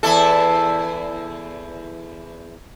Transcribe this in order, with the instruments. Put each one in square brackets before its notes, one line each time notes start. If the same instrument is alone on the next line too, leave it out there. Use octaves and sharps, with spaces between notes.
[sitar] E2 E4 A4